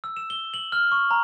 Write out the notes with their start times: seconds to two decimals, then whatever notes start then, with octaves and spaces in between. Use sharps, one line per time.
0.04 E6
0.17 E7
0.30 G7
0.54 F#7
0.72 F6
0.92 C#6
1.11 A#5